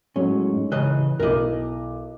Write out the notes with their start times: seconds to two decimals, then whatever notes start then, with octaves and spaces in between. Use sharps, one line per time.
0.16 A2 F#3 G#3 C#4
0.53 G#2
0.72 C#3 E3 D#5 F#6
1.20 B1 E4 A#4 D#5 D6